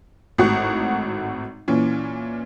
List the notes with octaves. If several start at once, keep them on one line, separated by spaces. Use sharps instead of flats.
G#1 A2 F#4 F#5 C#6
A#2 E3 C#4